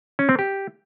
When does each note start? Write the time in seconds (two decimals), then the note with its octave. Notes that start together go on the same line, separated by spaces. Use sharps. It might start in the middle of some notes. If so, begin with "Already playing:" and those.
0.19 C#4
0.29 C4
0.39 G4